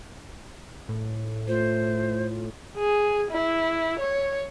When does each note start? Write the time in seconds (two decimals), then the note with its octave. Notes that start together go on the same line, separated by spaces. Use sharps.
0.89 A2
1.48 A3 F4 C5
2.77 G#4
3.31 E4
3.99 C#5